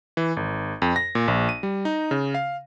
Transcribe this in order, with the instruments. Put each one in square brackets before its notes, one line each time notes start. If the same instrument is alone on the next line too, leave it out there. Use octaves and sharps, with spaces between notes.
[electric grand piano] E3
G#1
F2
A#6
A#2
A#1
D#7
G3
D#4
C#3
F5